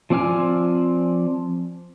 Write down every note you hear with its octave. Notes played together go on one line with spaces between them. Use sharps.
F3 C4 D5 G#5 F6